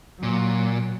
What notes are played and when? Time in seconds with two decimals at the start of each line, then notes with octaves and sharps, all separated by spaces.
0.23 A#2 F#3